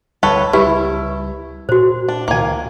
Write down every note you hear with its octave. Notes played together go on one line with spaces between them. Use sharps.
D1 D2 G3 A4 B4 C#5
C#2 G3 E4 G4 B4 C#6
A#2 F#4 C5
D4
C#2 A#2 D#3 A#3 G#5